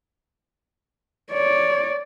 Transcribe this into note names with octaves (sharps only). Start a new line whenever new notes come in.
C#5 D5